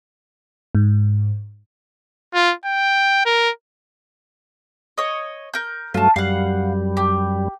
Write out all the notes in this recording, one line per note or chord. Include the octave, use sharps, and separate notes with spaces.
G#2
F4
G5
A#4
C#5 D#5
A#4 G6
G2 F#3 A3 F4 A5
F#2 G3 F5 F#5
G4